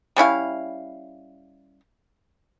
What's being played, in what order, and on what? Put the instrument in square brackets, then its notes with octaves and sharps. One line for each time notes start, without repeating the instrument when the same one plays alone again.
[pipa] G3 C#4 E4 F5